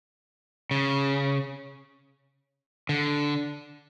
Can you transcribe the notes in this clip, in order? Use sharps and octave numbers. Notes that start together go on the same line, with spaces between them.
C#3
D3